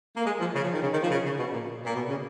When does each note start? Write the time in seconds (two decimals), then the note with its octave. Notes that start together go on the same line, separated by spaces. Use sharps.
0.17 A#3
0.26 G#3
0.40 F3
0.54 C#3
0.64 F3
0.73 D#3
0.82 C#3
0.92 D#3
1.01 F3
1.10 C#3
1.25 C#3
1.39 B2
1.52 A#2
1.85 A#2
1.95 B2
2.09 C#3